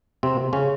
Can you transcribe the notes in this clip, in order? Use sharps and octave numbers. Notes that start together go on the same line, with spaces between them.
C3 C4
C#3 C#4